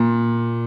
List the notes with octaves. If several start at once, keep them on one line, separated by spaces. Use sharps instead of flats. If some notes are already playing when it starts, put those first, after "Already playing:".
Already playing: A#2